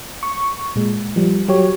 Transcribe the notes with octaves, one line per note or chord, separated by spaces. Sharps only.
C#6
A#2 G#3
F3 G3
F#3 G4 C#5